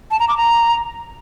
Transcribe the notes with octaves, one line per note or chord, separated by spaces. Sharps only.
A5
A#5
D6
A#5